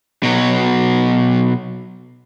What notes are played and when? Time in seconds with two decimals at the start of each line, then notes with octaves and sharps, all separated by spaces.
0.23 B2 F#3